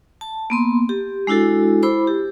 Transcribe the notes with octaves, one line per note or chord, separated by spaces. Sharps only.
A5
A#3 B3 C6
G4
G#3 D4 E4 F#4 A4
E4 C5 B5 D6
G4